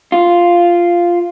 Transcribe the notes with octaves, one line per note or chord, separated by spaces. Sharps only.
F4